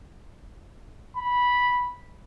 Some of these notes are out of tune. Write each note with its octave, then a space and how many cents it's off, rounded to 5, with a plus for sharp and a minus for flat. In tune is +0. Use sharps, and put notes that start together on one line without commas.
B5 -10